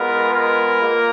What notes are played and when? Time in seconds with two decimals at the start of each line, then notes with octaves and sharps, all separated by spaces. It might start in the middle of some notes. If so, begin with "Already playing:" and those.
Already playing: G#3 B3 F4 A#4
0.30 A#4
0.81 A#3 F4